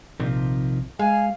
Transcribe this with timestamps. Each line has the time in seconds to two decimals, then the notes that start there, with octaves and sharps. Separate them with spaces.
0.20 A#1 C3 D#3 F3
0.99 G#3 F5 G#5